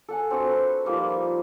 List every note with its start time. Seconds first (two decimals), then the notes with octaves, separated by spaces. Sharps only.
0.09 A4 F#5 G#5
0.30 C4 D4 F#4 A4
0.52 B4
0.85 F3 G3 A#3 D#4